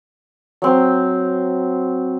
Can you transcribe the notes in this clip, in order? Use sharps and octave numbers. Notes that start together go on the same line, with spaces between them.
F#3 C4